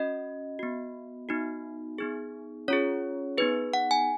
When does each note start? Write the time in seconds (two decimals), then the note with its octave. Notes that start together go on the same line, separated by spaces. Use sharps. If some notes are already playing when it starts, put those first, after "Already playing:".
Already playing: C#4 F#4 D#5
0.59 B3 F#4
1.29 B3 D#4 F#4
1.98 B3 D#4 G#4
2.68 C#4 F4 G#4 C#5
3.38 B3 D#4 G#4 B4
3.74 F#5
3.91 G#5